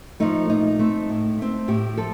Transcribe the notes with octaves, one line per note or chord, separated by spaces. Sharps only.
F3 A3 D#4
A#2 D#4
A3 C4
A2
A3 C4
A2 G4
F3 A4